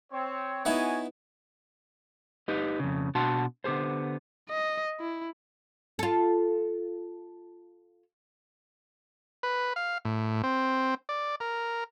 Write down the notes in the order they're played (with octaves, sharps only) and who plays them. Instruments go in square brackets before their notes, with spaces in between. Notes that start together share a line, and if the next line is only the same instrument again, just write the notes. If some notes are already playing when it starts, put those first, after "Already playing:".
[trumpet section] C4 C#5
[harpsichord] B3 D#4 E4 [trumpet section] F#4 C#5 G#5
[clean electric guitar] D#4 G4 B4 D#5
F2 C#3
B2 D4 F#4 F#5 A5 C6
D3 B3 G4 G#4 C5
[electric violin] D#5
E4
[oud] F4 A4
[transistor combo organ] B4
F5
A2
C4
D5
A#4